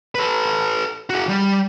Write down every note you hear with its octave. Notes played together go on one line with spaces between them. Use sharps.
A4 B4
F#4 G#4
G3